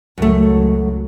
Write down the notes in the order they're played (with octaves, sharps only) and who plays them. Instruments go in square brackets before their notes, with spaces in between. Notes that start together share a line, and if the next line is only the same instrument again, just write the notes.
[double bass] C#2 F#3 [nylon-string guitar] F#2 A3